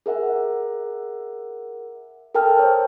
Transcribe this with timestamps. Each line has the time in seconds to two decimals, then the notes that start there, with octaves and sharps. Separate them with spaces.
0.06 G#4 A#4 E5 F#5
2.35 A4 A#4 G5 A5 F6
2.59 C5 C#5